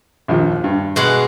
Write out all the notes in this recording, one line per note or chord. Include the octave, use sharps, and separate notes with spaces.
A#1 D#2 F3
G2
B2 G#3 F#5